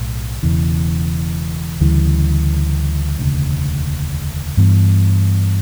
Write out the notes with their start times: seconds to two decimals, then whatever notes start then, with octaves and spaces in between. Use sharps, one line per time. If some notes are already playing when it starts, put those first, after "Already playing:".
Already playing: B1 A2
0.43 E1 E2 C#3 E3
1.80 D2 C#3 E3 G3
3.19 E1 D2 C#3
4.57 G2 E3 B3